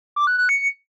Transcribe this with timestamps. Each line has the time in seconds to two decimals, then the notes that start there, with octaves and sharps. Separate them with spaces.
0.16 D6
0.27 F#6
0.38 F#6
0.49 C#7